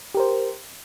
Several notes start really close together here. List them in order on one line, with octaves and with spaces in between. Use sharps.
G4 A#4 C5